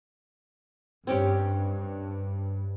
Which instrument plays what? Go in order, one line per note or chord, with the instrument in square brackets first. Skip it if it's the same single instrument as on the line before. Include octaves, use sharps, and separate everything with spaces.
[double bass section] G2 [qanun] C4 C#4 G4